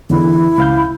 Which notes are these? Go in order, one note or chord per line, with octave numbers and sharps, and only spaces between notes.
E2 D3 E3 E4
C#2 F5 G6